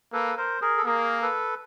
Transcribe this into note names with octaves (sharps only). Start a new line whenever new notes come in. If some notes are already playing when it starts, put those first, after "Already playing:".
A#3 A4 B4
A#4 C5
G#4 A#4
A4
A#3 G#4 A#4
A4 B4